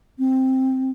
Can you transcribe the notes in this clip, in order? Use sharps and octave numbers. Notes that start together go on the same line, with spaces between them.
C4